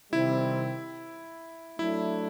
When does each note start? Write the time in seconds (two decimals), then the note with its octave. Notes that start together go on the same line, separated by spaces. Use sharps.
0.12 C3 D#3 G3 C4 E4
1.79 F#3 A3 D4 E4